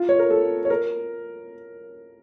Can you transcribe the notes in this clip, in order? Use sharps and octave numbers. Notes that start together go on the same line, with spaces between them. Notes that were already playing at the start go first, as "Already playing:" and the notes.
Already playing: F4
C#5
A#4
A4
C#5
A#4